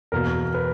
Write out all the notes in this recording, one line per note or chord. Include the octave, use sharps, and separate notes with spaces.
E2 B2 A#3 A#4
B4